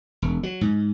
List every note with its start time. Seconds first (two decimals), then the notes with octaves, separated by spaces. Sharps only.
0.22 E1
0.43 F#3
0.61 G#2